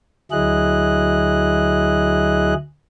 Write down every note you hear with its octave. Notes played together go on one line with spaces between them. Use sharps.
D2 F#3 E4 G#4 D#5 F#6